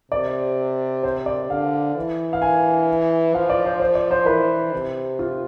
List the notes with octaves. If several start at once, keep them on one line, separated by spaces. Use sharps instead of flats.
C3 D5
C5
D5
D3 F5
E3
F5
G#5
F3 F5
D5
C5
C5
D5
C5
E3 B4
C3
F4